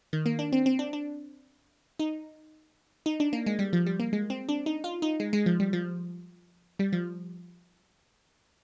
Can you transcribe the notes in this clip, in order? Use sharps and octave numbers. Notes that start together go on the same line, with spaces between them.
D#3
A#3
D4
C4
C4
D4
D4
D#4
D#4
D4
A#3
G#3
G3
F3
G3
A#3
G#3
C4
D4
D#4
F4
D#4
G#3
G#3
F3
G3
F3
G3
F3